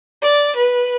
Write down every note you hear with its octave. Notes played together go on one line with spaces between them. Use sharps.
D5
B4